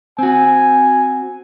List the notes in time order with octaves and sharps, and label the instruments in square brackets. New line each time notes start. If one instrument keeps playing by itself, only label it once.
[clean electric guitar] C4 F#4 [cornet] G#5